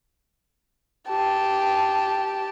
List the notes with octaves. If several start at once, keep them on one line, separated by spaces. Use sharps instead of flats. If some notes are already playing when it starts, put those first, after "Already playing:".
G4 A5